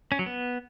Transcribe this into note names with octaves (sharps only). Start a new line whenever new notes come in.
C#4
F#3
B3